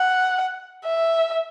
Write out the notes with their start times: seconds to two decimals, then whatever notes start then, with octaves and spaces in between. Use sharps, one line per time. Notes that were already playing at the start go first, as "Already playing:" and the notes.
Already playing: F#5
0.85 E5